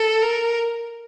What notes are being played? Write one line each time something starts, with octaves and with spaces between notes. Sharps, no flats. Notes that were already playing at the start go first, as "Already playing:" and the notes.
Already playing: A4
A#4